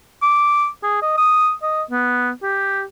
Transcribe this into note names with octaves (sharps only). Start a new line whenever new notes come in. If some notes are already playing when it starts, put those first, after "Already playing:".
D6
G#4
D#5
D#6
D#5
B3
G4